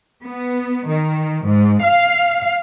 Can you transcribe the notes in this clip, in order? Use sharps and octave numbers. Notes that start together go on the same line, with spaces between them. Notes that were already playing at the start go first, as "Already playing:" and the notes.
B3
D#3
G#2
F5